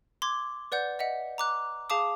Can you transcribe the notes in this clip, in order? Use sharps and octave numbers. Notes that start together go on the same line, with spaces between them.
C6 D6 G#6
B4 D5 F#5 G6
D#5 E5 F#5
A#5 D6 F#6
G#4 F5 A5 D6 D#6